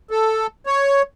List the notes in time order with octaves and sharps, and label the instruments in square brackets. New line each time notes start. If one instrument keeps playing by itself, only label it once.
[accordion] A4
C#5